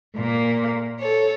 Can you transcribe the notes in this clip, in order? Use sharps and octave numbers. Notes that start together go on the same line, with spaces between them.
A#2 A#3
A4 C#5